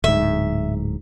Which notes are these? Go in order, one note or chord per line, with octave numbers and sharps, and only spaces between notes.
D1 G#2 E5